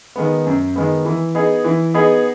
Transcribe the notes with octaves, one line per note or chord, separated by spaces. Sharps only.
D#3 G#3 B3
F#2
D#3 G#3 B3
E3
B3 D#4 G#4
E3
B3 D#4 G#4